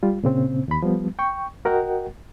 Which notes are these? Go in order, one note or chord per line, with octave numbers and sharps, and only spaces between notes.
G3 F4
A#2 C#3 C4
D#2 B5
F3 G3 B3
G5 C#6
F#4 A#4 D#5 F#5 G5